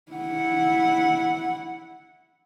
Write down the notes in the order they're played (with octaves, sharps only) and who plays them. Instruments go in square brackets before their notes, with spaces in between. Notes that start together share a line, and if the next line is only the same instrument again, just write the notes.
[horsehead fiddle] E4 F#5